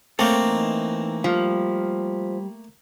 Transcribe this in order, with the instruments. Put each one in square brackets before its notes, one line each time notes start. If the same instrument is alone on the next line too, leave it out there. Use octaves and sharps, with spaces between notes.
[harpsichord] A3 A#3 [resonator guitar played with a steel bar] C4 [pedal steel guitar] A4 C#5 G5
[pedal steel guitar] E3 D#4
[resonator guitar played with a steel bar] F3 [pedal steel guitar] G3 F6